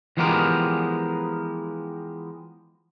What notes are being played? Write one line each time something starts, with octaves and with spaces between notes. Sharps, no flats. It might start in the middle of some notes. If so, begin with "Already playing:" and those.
E3 F3 G#3 B3 G4 A#4